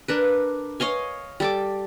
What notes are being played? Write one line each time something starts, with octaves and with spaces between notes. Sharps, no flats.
D4 A#4 B4
C#5 D#5 F5 G#5
G3 A4 D6